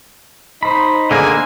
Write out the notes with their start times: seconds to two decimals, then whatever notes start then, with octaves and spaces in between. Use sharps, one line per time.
0.63 D#4 C5 B5
1.11 D3 A#3 G#4 G#5